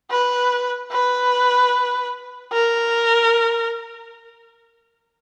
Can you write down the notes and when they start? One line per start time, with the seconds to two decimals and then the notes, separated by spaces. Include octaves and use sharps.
0.11 B4
0.92 B4
2.53 A#4